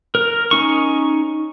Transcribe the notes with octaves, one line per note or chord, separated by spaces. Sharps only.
A#4
C#4 D#4 C#6